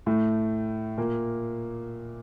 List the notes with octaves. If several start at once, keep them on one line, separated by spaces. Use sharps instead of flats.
A2 A3
A#2 A#3